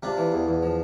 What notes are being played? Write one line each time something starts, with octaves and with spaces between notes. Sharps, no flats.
C3 D4 F4
E3
E2
E2
F3